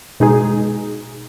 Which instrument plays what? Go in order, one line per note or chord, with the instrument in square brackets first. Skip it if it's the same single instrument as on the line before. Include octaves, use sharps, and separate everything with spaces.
[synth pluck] B2 G#3 D#4 G#4